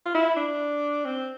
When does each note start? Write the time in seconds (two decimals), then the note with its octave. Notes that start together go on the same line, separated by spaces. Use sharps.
0.06 F4
0.15 E4
0.36 D4
1.05 C4